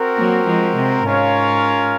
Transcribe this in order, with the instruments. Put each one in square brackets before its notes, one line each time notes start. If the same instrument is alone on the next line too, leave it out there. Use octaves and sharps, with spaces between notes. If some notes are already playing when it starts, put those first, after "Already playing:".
Already playing: [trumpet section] C4 F#4 A#4
[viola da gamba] F#3 A#3
F3 G#3
C3
[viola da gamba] G#2 [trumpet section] C#4 F4 A#4 C#5 F5